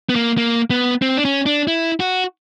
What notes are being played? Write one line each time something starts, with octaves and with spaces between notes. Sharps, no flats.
B3
A#3
A#3
B3
C4
D4
C#4
D4
E4
F#4